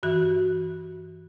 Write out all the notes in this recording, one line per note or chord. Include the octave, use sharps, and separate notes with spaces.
G2 E3 F#4